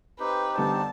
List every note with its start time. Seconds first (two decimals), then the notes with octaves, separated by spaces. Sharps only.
0.20 C4 D#4 G4 B4
0.58 D3 G3 B3 A5